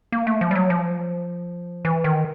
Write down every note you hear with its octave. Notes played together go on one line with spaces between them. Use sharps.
A#3
A3
F3
G3
F#3
F3
E3
D#3